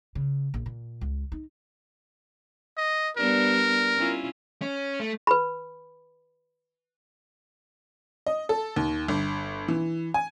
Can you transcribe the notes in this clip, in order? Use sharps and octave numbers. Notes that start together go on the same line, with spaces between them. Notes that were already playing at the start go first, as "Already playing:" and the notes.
C#3
A#1
A#2
C#2
D#4
D#5
G3 B3 D4 A#4
C#4 E4 F4
C#4
A3
B4 B5
D#5
A4
D#2
G1
E3
G#5